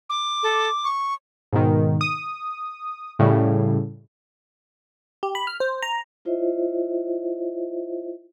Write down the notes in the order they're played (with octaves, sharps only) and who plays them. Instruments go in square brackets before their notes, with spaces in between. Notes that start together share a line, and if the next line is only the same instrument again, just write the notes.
[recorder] D6
[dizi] A4
C#6
[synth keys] G#2 B2 D#3
D#6
A2 C#3 G3
[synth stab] G4
B5
F6
C5
A#5
[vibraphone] E4 F4 C5 C#5 D#5 E5